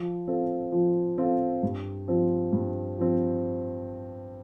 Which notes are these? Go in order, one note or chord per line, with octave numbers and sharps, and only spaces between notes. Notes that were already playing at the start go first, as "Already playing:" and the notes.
Already playing: F3
C4 F4 A4
F3
C4 F4 A4
G2
F3 C4
G2
F3 C4